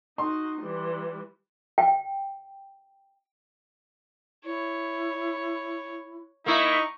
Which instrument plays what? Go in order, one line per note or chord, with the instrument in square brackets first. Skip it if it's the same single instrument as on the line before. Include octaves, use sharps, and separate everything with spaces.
[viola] D#4 F#4 [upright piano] C6
[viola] E3 G3
[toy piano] G5
[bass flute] E4 [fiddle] C#5
[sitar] A#3 E4 [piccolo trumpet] D#4 [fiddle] C#6